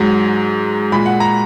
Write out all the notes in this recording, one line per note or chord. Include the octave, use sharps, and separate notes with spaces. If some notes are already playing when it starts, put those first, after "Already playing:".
Already playing: G#2 F#3
A#2 G#3 B5
F#5
A#5